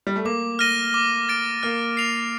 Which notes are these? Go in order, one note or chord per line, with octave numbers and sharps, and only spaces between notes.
G3
A3
A#3 D6
F6 A#6 D#7 G7
D6
A6 D7
A#3 F6
C7 F7